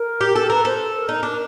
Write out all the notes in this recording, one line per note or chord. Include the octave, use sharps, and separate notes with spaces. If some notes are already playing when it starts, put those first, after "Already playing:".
Already playing: A#4
G4
A4
A#4 B4
A4 C5
A#4
D#4
D4